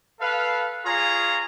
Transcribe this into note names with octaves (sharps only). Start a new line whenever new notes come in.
A4 B4 F5
F4 G#4 C#5 A#5